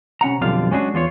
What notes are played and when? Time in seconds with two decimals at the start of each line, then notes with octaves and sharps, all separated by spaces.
0.21 C3 C#4 F#5 A#5
0.41 B1 F2 D3 G3 F4 F5
0.71 G#3 C#4 D4 E4 F#4 G#4
0.94 E2 F4 F#4 C#5